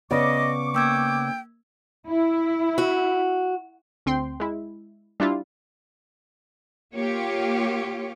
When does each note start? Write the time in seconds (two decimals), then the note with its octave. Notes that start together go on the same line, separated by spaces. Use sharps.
0.11 C#3 B3 D5 D#5 C#6 D6
0.74 A#3 G5 E6 G#6
2.08 E4
2.78 F#4
4.06 D2 C4 G5 C6
4.40 G#3 E4
5.20 G3 D4 E4 F4
6.94 A#3 F4 G4 C#5